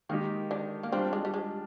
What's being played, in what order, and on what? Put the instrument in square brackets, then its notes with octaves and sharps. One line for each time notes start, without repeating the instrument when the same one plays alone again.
[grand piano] D#3 G#3 D#4 G4 [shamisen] A#3
[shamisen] D3 D4
A#3
[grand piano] G3 D4 F4 [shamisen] C4
[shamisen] G#3
G3
G#3